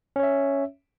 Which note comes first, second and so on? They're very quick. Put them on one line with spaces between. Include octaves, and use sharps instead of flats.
C#4 C#5 E5